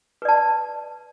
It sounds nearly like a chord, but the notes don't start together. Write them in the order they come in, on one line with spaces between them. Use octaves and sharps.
B4 D5 A5